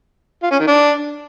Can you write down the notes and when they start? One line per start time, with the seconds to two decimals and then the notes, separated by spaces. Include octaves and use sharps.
0.43 F4
0.51 C#4
0.59 D#3
0.67 D4